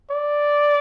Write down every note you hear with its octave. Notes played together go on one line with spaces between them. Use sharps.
D5